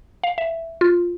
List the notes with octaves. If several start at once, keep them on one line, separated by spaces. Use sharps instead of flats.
F5
E5
F4